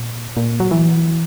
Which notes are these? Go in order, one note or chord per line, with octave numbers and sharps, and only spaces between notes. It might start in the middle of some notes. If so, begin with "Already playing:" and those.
Already playing: A#2
A#2
F#3
E3